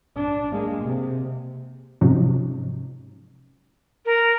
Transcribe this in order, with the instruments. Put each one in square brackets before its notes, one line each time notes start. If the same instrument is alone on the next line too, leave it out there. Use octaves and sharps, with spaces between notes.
[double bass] D4
G#3 A#3
C3
[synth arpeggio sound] G#2 C3 F3 F#3 C#4
[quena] A#4